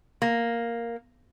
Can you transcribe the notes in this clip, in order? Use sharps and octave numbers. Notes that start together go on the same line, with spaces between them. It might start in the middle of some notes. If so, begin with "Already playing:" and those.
A#3